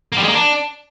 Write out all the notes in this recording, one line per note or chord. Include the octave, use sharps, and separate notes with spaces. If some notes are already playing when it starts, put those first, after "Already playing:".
A#3
G3
G#3
A#3
D4